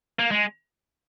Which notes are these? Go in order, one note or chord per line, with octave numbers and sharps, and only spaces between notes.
A#3
G#3